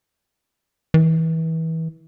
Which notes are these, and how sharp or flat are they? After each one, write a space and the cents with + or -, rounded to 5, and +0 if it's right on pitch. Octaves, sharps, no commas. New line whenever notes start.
E3 -30